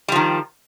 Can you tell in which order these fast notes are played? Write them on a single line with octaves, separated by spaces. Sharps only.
G3 F3 D#3